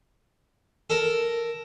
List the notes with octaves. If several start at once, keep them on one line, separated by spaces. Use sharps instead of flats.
A4 A#4